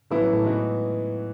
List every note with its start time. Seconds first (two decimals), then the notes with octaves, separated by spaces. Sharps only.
0.11 F#2 A2 E3 A3 B3 E4 B4
0.21 F#3
0.33 A2 A3
0.44 G#2 E3 G#3 B3 D#4 F#4